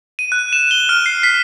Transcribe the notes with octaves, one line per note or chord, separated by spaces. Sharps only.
D#7
F#6
E7
G7
F6
C7
B6